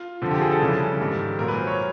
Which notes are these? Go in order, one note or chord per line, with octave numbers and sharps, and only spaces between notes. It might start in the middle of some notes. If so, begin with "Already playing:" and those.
Already playing: F4
F2 D3 F3
G4
G#4
A4
F2 C#3 E3 G3
G#2 D#3 G3
A#2 F#3 A#4
B4
C5
C#5